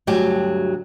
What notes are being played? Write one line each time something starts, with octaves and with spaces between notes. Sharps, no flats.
D2 G2 F#3 G4 G#5